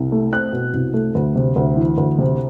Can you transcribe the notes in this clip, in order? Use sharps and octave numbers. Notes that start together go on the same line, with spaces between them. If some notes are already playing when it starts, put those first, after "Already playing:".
Already playing: C2
A3
C4 F#6
B2
C2
A3
D2
C3
D2
E3
D2
C3